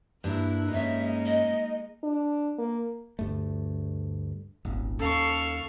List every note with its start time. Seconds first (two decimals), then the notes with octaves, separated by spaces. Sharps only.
0.24 G2 A#3 D4 E4 A#4
0.73 G2 G#3 A#3 C#4 D#4 E5
1.26 D#5
2.03 D4
2.58 A#3
3.19 D2 G2 A3
4.65 D#1 G#1
5.00 D#2 C#4 A4 F5 C#6